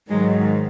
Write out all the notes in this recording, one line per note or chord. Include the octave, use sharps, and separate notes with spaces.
G#2 D#3 F#3 G#3